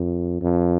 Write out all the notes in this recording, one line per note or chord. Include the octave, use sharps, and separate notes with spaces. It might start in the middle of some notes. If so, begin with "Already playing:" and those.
Already playing: F2
F2